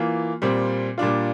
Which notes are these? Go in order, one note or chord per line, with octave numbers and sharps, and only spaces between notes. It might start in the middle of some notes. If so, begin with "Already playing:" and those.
Already playing: E3 A#3 F4
A#2 G3 C4
A#2 G3 D4 F4